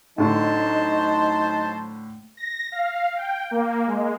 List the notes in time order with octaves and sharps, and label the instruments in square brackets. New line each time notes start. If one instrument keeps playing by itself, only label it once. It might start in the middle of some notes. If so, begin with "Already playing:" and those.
[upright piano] A2 D3 [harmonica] F#3 C5 A5 [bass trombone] D#4
[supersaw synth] A#6
F5
G5
A#3
G#3